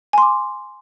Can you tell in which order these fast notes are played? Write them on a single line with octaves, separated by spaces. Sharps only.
G#5 C6 D6